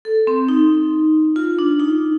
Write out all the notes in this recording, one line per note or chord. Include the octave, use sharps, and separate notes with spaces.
A4
C4
D#4
F4
D4
D#4